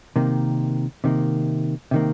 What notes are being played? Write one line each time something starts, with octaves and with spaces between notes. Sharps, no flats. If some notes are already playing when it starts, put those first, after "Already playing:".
C3 D#3 A#3
C3 D#3 A#3
C3 D#3 A#3